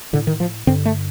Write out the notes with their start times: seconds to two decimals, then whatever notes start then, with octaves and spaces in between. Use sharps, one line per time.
0.13 A2 D3
0.27 D#3
0.40 F3
0.67 G2 D3 C4
0.86 A3